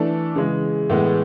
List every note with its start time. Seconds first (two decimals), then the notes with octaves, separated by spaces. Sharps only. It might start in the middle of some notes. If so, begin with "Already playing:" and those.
Already playing: E3 A3 D4 A4 D5
0.35 C#3 E3 G#3
0.90 A2 E3 G#3 B3